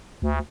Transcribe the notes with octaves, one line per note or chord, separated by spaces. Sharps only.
D2